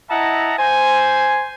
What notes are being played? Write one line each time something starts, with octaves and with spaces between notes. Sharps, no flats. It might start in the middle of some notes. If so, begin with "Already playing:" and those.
E4 D#5 E5 F#5 A5 A#5
C5 G#5